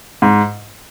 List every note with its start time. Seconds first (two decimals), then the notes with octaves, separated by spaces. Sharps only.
0.22 G#2